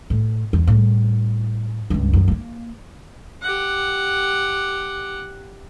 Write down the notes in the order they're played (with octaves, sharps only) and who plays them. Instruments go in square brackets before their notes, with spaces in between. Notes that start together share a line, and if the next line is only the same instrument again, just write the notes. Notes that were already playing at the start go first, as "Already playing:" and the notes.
[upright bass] A2
E2
A2 G3
C#2 G2
F#2 E3
G#3 A#3
[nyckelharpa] G4 F#5